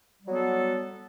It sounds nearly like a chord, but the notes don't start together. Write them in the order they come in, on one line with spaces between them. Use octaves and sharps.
G3 F#3 B3 A4